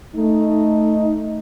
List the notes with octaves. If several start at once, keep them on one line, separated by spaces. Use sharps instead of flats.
A3 D#4